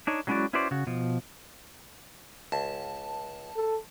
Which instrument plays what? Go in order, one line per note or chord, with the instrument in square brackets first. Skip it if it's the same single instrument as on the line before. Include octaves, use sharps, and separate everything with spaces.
[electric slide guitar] D4 D#4 C#5
F#3 G#3 C#4 E4 F#4 D5
C#4 E4 F#4 B4 C5 D5
C#3 F#4
B2 F3
[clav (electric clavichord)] C#2 [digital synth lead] A5
[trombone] A4